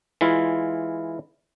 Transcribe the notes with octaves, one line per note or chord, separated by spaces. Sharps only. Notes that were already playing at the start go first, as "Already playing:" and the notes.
E3 G#3 E4 F4 F5